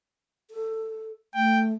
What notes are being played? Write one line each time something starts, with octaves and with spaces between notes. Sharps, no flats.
A4
A3 G5